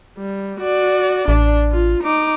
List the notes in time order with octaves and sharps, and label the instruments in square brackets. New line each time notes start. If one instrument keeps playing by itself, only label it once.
[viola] G3
F#4 D5
[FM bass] A1 [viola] D4
[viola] F4
D#4 D6